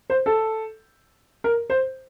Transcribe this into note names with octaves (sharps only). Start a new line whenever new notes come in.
C5
A4
A#4
C5